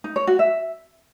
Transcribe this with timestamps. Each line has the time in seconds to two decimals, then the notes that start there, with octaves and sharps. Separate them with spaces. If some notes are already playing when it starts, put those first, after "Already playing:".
0.04 D#4
0.16 C#5
0.27 F#4
0.39 E5